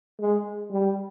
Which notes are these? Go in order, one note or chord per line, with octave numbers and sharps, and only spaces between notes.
G#3
G3